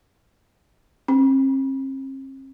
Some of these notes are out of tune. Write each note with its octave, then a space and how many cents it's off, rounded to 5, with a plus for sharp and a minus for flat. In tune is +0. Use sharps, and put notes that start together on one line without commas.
C4 +45